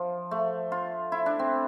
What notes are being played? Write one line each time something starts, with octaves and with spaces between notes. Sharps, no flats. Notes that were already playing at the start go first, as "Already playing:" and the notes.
Already playing: F3
A3
F4
E4
D4
C4